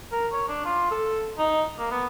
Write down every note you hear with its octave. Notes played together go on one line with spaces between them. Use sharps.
A#4
C#5
D4
F4
A4
D#4
A#3
B3